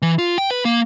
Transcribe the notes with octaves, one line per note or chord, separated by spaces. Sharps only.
E3
F4
G5
B4
A#3